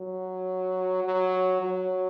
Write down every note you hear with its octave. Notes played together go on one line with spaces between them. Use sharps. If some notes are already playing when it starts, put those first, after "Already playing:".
Already playing: F#3
F#3
F#3